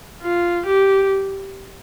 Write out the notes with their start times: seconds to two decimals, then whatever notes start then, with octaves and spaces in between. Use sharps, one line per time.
0.22 F4
0.66 G4